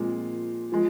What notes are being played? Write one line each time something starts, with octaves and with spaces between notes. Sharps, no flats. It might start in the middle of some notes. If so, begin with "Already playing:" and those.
Already playing: A#2 F3 G#3 C4
F3 G#3